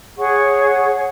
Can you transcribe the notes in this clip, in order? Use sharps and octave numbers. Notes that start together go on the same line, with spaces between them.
G#4 C#5 F#5 C#6